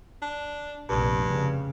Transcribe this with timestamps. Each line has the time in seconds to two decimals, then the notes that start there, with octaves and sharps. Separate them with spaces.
0.22 D4
0.89 F1 A#1 G2
1.24 C#3